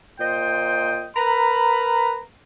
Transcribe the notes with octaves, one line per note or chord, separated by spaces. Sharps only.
A#2 C5 D#5 G5
A#4 B4 A#5 B5